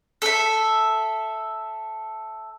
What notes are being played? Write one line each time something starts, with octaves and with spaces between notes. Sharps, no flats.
A4 E5